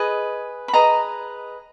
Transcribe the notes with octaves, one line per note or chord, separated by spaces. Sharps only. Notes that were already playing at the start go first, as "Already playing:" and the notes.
Already playing: G#4 B4 D#5
B5
G#4 B4 D#5 A#5